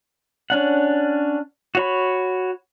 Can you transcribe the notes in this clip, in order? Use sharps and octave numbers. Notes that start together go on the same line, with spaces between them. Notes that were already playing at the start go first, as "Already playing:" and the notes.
C#4 D4 F#5
F#4 C#5 B5